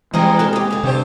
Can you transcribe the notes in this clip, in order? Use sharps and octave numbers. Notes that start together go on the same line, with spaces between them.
E3 G3 G#3 C4 G#4 A#4 D#5
F#4 A4
D#2 B3 G4 G#4
F2 D3
G2 C3 G4 C5